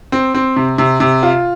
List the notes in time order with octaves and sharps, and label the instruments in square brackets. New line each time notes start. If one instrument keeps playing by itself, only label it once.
[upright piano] C4
C4
C3
C3
C3
F4